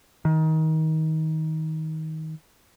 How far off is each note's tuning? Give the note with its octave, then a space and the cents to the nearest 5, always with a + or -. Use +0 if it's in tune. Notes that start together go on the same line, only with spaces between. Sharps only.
D#3 +25